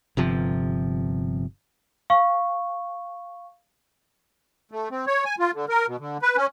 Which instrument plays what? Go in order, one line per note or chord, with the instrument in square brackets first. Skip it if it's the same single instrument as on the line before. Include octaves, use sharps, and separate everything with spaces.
[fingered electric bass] G1 C3 F3
[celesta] F5 C#6
[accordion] A3
C4
C#5
G#5
F4
D3
A#4
B2
D3
B4
C#4